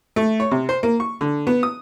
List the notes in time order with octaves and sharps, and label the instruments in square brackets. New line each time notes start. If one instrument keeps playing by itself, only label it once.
[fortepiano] A3
C#5
C3
C5
A#3
C#6
D3
B3
D#6